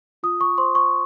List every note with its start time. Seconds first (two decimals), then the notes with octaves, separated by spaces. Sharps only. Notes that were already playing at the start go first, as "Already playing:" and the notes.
0.23 F4 D#6
0.41 C#6
0.58 C5 C6
0.75 C#6